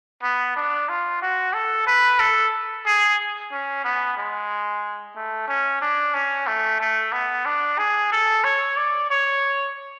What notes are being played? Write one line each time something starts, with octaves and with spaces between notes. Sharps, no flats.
B3
D4
F4
F#4
A4
B4
A4
G#4
C#4
B3
G#3
A3
C#4
D4
C#4
A3
A3
B3
D4
G#4
A4
C#5
D5
C#5